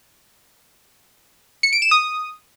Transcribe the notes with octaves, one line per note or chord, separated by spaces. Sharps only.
C#7
D7
E7
D#6